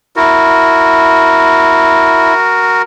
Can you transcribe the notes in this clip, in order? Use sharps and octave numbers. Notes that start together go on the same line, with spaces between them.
E4 F#4 A#4